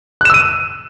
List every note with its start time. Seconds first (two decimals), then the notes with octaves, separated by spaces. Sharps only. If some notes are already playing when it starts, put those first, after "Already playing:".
0.21 F#6
0.25 E7
0.30 E6
0.34 D#7